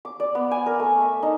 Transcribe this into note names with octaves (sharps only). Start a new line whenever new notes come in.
D6
D5
B3
G#5
A#4
A3
E5
D#4